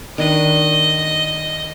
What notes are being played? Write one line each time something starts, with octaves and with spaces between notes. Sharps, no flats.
D#3 D4 B4 D#5